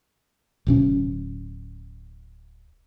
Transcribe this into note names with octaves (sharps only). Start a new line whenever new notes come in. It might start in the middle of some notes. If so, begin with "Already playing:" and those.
D1 B2 C#4